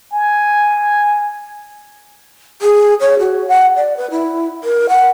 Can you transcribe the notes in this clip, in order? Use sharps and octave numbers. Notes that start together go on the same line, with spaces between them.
G#5
G#4
C#5
F#4
F#5
D5
B4
E4
A#4
F#5